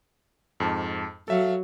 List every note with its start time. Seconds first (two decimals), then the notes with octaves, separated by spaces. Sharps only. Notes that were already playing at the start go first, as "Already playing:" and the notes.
0.60 F2 G#2 A5
1.28 F#3 A4 E5 F5